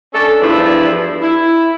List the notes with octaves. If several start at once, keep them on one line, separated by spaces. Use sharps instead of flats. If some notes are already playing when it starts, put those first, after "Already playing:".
C#4 D4 A4
E2 G2 F3 D4 E4
E4